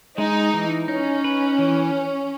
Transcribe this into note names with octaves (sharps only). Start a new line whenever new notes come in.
G#3 D#4
E3
C#4 D#4
B4
E3